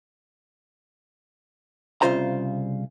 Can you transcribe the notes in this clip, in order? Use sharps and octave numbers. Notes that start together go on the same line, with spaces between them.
C2 G2 C#3 F4 C5 A#5